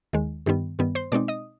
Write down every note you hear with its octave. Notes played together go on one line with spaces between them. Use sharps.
D#2 D#3 G#3
G2 D#3 G3 B3
G2 D#3 G3 B3
C5 C6
B2 G#3 C4 D#4 D5 D6
D#5 D#6